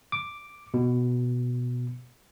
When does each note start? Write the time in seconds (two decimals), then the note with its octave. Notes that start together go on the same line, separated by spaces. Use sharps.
0.12 D6
0.74 B2